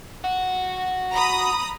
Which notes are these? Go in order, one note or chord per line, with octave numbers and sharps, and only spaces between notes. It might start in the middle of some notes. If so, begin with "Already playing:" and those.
F#4
A#5 B5 D#6